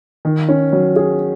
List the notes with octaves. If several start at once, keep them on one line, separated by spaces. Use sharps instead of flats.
D#3
C#4
F#3
G#4